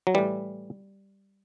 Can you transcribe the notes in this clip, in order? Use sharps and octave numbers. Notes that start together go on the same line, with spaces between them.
F#3
A2 E3 G3